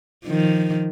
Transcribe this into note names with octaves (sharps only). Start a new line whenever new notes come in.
D#3 F3